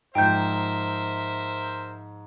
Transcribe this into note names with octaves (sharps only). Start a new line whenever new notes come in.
G#2 F3 A#4 C5 E5 G5 G6